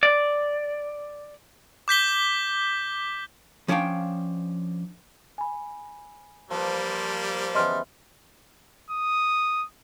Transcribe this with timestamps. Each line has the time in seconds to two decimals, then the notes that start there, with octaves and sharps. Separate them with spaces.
0.03 D5
1.88 D6 G6 B6 G7
3.68 F3 C#4 D4 F5 G5
5.38 G#5 B5
6.51 F3 G3 A#3 B4
7.55 C#3 E3 B3 D#5 C6 F6
8.90 D#6